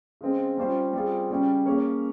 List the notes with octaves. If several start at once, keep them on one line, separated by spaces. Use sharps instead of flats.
C#3 G#3 C4
G3 C#4 F4 C5
G3 C4 F4 G#4
C#3 G3 C#4 G4
A#3 C#4 G#4 C#5